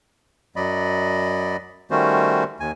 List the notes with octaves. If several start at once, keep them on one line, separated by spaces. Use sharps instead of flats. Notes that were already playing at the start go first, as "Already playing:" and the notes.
F#2 F#3 D5 D#5 B5
D#3 G3 A3 C#4 F#4 C5
D#2 G#5